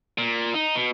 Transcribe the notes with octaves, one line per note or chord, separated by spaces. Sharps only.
A#2
D#4
B2